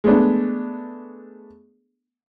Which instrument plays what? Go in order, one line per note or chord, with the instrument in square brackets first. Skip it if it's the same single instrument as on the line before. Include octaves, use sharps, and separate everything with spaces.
[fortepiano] G#3 A3 B3 D4